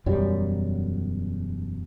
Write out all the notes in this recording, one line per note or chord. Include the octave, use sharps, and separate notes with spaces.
E1 F#2 F#3 G3